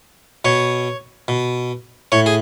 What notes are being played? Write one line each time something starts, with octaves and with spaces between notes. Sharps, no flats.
B2 C#5
B2
A2 C#5
G#4